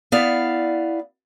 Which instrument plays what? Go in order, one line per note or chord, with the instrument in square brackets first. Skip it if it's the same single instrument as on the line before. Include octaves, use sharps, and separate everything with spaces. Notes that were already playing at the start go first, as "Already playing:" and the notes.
[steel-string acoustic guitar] B3 E4 D5 F5